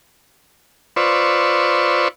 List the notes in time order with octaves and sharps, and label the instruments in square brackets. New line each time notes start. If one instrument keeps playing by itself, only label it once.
[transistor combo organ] F4 B4 C5 D5 C#6 E6